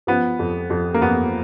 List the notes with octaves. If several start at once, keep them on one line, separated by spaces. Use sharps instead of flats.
F3 B3
F2
F2
A#3
F2 B3